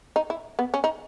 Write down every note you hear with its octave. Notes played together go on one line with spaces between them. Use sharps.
D#4
E4
B3
C#4
D#4